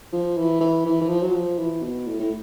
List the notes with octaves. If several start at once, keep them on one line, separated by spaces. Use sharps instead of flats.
F3
E3
E3
E3
E3
F3
F#3
F3
E3
B2
A2
A2